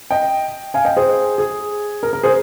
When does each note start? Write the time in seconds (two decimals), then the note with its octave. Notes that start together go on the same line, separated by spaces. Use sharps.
0.11 D#5 G5
0.74 F5 G#5
0.85 D#5 G5
0.97 G#4 C5
1.38 G#4
2.03 A#4
2.13 A#4
2.23 G#4 C5